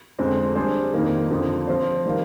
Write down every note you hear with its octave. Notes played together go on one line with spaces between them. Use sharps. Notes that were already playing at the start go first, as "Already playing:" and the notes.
F2 D3 G#3 C4
G3 D4 G#4 C5
F2 D#3 A#3 D#4
F2 D3 F3
F3 C4 F4 C5
D#3 G3 C4 F4 A#4